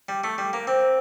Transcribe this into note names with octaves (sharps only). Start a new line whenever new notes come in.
G3
A3
G3
A#3
C4